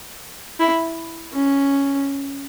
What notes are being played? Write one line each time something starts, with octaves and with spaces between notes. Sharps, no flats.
E4
C#4